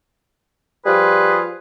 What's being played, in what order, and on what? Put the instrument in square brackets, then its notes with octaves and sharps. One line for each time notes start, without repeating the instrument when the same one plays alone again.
[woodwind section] F3 G3 F4 G#4 B4